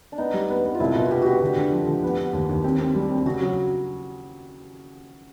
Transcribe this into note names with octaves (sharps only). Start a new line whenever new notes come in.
D4
B3 D#4
G3
B3
B3
F4
C2 E4
B2 F4
F#4
B3 G4
B3 F#4 G4
D3
D3
F3
D3
B3
B3
D#2
D#2
C4 G4
C4
G3
C4
C#3 F#4
F#3